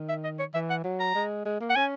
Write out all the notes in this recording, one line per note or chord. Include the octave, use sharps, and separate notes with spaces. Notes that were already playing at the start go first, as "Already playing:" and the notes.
Already playing: D#3
E5
D#5
C#5
E3 E5
F#5
F#3
A#5
G#3
G#3
A#3
F#5
C#4 G#5